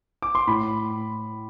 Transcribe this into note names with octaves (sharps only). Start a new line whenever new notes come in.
D6
C6
A2 B5